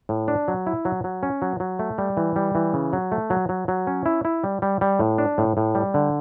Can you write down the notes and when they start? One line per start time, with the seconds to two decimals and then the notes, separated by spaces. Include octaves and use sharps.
0.09 A2
0.28 D4
0.48 F#3
0.67 E4
0.85 F#3
1.04 F#3
1.23 C#4
1.42 F#3
1.60 F#3
1.79 A3
1.98 G3
2.17 E3
2.36 G3
2.55 E3
2.73 C#3
2.93 F#3
3.12 A3
3.30 F#3
3.49 F#3
3.68 F#3
3.87 C#4
4.06 E4
4.25 E4
4.44 G3
4.62 G3
4.81 G3
4.99 A2
5.18 D4
5.38 A2
5.57 A2
5.75 G3
5.94 D3